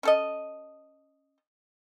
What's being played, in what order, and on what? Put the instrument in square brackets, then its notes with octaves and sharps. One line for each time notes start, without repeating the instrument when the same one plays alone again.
[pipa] C#4 A4 D#5